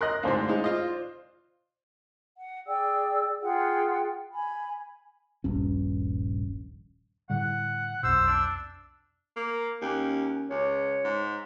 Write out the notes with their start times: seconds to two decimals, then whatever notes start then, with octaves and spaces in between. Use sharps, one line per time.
0.01 A#4 D#5 C6 F#6 A#6
0.23 D2 G#2 C5 D5 F5
0.49 G#3 D#4
0.64 F4 D#5
2.37 F#5
2.67 G#4 D5 G5 E6
3.42 F4 G#4 F#5 G5
4.32 G#5 B5
5.44 D#1 A#1 G2 C#4
7.30 A2 D3 G3 F#5
8.03 B1 F2 B2 C5 E6
8.27 D4
9.36 A#3
9.81 D#2 C#4
10.50 C#2 C#5
11.04 G#2